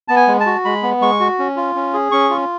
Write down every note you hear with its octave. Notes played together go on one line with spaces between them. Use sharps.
B3 A5
G#5
G#3
A5
F#4
G#3 B5
B3
G#3 C#6
F#4
C#4
F4
C#4
G#4
C#4 C#6
F4